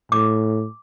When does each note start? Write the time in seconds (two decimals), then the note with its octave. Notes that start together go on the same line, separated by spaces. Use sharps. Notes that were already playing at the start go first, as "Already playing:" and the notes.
0.12 A2 D6